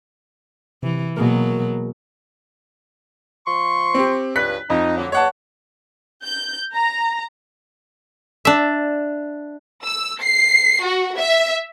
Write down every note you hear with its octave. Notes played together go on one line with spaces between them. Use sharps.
C3 E3
B2 F#3 A#3 G#4 A#4
F3 C6 C#6
C4 G4
C#2 G2 B4 F#6 B6
F2 D#4
D3 F#3 A#3
E2 G#3 A#3 C#5 F#5 A5
G6
A#5
D4 E5
E6
C7
F#4
E5